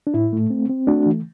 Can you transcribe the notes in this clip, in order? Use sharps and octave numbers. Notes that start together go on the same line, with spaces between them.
D4
A2 E4
A3
C4
C4
A3 D4 F#4
E3